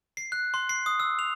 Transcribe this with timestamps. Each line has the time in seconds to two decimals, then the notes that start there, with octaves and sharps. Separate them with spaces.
0.17 C7
0.32 F#6
0.54 C6
0.69 C7
0.86 D#6
1.00 E6
1.19 F7